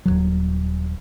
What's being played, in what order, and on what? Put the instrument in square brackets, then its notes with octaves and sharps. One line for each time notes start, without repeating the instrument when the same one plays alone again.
[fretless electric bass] D#1 C#2 F#3